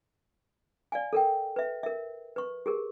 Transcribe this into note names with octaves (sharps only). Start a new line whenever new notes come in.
D5 F5 G#5
A4 A#4 G5
B4 E5
A#4 E5
B4 C#6
G4 G#4 A#4